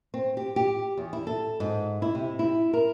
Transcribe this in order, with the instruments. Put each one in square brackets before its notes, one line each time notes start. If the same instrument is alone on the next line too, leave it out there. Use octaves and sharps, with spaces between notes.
[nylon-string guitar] C4
G4
G4
E2
E4
A4
G#2
E4
C3
E4
A#4